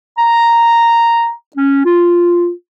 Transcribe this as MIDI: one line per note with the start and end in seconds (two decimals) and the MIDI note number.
0.17 1.32 82
1.56 1.84 61
1.85 2.51 65